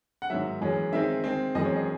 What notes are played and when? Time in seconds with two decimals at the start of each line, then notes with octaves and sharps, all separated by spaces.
0.22 F#5
0.30 G#2 D#3 F#3 E5
0.61 F#2 E3 G#3 C#4
0.92 D#3 G#3 C4 D#4 E5
1.24 D#3 G#3 C4
1.55 F#2 E3 G#3 C4 D#5
1.65 C#5
1.76 D#5